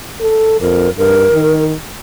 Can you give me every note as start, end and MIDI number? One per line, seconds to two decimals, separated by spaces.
0.21 0.60 69
0.60 0.88 41
0.60 0.90 70
0.97 1.26 43
0.97 1.63 70
1.32 1.74 51